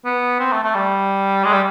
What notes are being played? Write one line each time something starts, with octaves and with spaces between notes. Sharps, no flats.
B3
C4
A3
A3
G3
G#3
G3